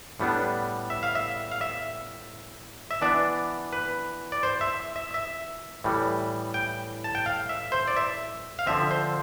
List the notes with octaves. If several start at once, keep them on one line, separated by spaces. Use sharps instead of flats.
A2 G3 B3 D4
E5
F5
E5
F5
E5
E5
E3 B3 D4 D5
B4
D5
C5
E5
E5
E5
A2 E3 G3
G5
A5
G5
F5
E5
C5
D5
E5
F5
D3 F3 C4 E5
C5